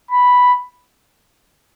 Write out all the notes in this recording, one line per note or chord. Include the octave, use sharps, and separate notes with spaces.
B5